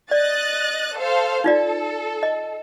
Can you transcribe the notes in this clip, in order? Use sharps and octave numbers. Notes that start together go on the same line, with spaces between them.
D5 D#5 F#6 A6
A4 C5 F5
D#4 F4 A4 D5
D#5